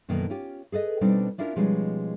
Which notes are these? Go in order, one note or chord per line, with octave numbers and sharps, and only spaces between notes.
F#2 B2 D3 D#3 A#3 D4
C#4 F4 G4
G#4 A4 B4 D#5
B2 G3 C4 D4 D#4
C#4 D4 E4 F4 A#4
B2 F3 G3 G#3 C#4 D#4